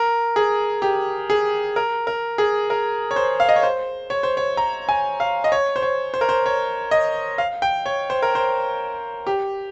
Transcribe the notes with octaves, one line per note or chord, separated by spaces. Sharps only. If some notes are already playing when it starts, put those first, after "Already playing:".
Already playing: A#4
G#4
G4
G#4
A#4
A#4
G#4
A#4
C#5
C5
F5
D#5
C#5
C5
C#5
C5
C#5
A#5
G#5
F5
D#5
C#5
C5
C#5
C5
A#4
C5
C#5
D#5
F5
G5
C#5
C5
A#4
C5
G4